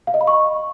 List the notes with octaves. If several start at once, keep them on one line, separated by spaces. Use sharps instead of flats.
F5
D#5
B5
C#6